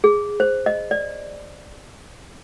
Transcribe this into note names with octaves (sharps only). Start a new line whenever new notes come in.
G#4
C5
D#5
D5